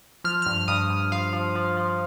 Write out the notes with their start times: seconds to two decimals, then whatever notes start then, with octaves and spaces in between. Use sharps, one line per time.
0.24 F3 F6
0.42 G2 F6
0.68 G2 D#6
0.90 G2
1.12 F3 F5
1.33 F3
1.55 F3
1.77 F3